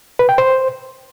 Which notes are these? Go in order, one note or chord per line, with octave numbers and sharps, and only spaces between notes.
B4
G5
C5